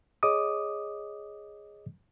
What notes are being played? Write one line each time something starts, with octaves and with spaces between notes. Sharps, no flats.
G#4 C#5 D#5 D6 D#6